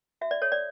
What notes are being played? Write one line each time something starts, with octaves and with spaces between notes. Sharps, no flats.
F#4 E5
D5
A4 C#5
D5